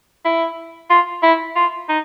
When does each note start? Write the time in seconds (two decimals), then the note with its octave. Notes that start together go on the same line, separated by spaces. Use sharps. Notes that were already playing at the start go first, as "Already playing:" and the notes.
0.25 E4
0.90 F4
1.23 E4
1.56 F4
1.89 D#4